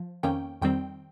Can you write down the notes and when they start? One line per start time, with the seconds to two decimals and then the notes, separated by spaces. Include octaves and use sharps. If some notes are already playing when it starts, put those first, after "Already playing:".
Already playing: F3
0.23 F2 D#3 A#3 C#4 G5
0.62 F2 D#3 G3 C4 G5